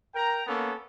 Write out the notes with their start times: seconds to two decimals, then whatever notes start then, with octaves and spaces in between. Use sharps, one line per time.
0.14 A#4 G5 A#5
0.47 A#3 B3 C#4 A4